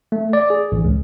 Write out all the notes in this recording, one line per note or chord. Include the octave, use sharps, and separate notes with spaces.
A3
D5
G#4
A1
C#2